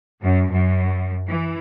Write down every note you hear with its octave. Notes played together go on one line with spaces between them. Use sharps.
F#2
F#2
E3